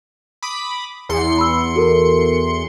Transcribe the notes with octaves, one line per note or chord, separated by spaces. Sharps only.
B5 D6 D#6
E2 C6 C#7
B5 E6
F#4 A4 A#4